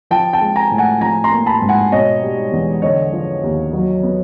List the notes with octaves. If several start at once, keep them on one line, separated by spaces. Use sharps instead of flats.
F3 G5 A5
G5 A5
G#3
G#5 A#5
A2
F#5 G#5
F3 G#5 A#5
A#5 C6
A#3
A5 B5
G#2
F#5 G#5
B2 C#5 D#5
G3
E2
D3 C#5 D#5
F3
D#2
F#3
B3